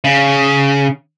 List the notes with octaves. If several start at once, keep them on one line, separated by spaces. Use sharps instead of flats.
C#3